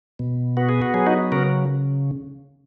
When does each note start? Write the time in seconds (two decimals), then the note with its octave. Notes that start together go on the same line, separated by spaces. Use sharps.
0.19 B2
0.57 B3 F#4
0.69 G#4
0.82 F#4
0.94 F#3 G#4
1.06 D#4 F#4
1.32 C#3 F#4 A#4